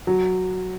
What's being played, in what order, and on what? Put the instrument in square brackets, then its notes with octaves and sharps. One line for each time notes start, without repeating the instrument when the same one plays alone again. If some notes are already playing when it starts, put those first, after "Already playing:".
[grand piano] F#3